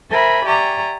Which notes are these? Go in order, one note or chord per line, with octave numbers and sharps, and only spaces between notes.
A#4 C5 E5 G#5 B5
G4 D5 E5 G#5 A#5 C#6